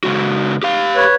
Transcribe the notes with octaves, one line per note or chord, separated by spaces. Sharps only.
C#3 G#3 F#4
G4 F5
B4 C#5